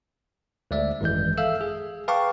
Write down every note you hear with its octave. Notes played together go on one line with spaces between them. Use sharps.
D2 G#3 D5 E5
G#1 F#2 E3 G#3 G6
A4 E5 F5 E6
G#4
B4 F5 G5 A5 C#6 D6